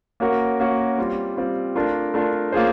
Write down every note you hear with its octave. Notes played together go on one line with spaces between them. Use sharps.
A#3 C#4 F#4 A#4
A#3 C#4 F#4 A#4
G3 C4 F4
G3 C4 F4
A3 D4 F4 A#4
A3 D4 F4 A#4
A#3 C#4 F4 G#4 C5